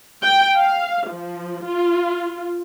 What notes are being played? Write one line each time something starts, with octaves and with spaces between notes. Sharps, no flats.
G5
F5
F3
F4